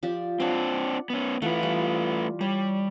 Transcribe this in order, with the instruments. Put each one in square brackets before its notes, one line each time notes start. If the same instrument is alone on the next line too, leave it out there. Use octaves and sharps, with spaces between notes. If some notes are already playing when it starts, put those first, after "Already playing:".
[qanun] F3 G4 D5
[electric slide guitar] C4 D4 [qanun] D5 F#5
[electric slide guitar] B3 C#4
[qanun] E3 F4 F#5 [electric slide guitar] A3 B4
[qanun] G3
[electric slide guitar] G3 [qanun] C#5